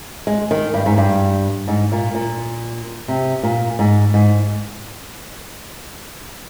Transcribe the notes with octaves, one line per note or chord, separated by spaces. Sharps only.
G#3
D#3
G2
G#2
G2
G#2
A#2
A#2
C3
A#2
G#2
G#2